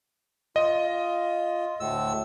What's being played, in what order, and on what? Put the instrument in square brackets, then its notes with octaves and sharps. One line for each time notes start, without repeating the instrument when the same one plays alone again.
[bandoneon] F4 [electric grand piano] D#5
[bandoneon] D2 A2 E6